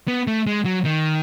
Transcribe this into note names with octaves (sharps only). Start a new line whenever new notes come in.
B3
A3
G#3
F#3
D#3